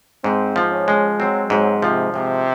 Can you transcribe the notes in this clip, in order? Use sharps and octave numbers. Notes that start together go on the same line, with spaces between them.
G#2 C4
F3
C#4
G#3
F#3 C4
G#2 F#3
C3 F3
G#2 C3